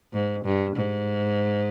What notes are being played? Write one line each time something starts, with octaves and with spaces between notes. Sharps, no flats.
G#2
G2
G#2